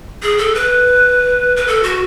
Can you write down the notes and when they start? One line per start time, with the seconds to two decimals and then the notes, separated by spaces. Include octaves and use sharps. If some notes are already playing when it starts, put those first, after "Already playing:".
0.22 G#4
0.38 A4
0.55 B4
1.56 B4
1.67 A4
1.83 F#4